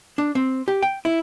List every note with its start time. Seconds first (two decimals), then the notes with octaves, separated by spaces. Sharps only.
0.18 D4
0.35 C4
0.68 G4
0.82 G5
1.05 E4